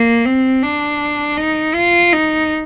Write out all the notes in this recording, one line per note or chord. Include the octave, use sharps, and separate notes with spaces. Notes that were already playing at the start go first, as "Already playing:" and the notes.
Already playing: A#3
C4
D4
D#4
F4
D#4